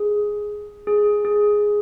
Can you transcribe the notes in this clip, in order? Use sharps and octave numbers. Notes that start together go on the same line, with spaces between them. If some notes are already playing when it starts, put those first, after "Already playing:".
Already playing: G#4
G#4
G#4